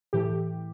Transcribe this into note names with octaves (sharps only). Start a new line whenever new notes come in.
A2 E3 A3 G4